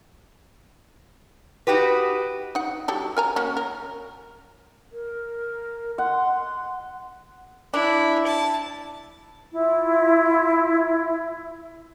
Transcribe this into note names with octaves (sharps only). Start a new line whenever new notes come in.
D#4 F#4 G4 B4
D#4 F#5
F#3 G4 A4
A#4 G#5 A#5
A#3 C#4 F#4
A#4
A#4
F#5 C6
D4 E4
A5
E4 F4